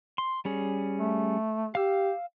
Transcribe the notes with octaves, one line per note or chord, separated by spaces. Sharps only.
C6
G3 C#4 G#4
A3
G4 F5 E6